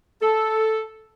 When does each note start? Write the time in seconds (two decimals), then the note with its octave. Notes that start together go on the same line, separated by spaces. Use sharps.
0.21 A4